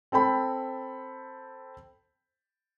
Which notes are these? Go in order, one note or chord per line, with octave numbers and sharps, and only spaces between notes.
C4 A4 G5 B5